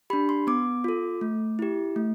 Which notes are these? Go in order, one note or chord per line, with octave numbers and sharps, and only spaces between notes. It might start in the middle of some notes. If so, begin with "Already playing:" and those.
D4 G4 B5
C6
B3 D6
F4 A4
A3
E4 G4
A3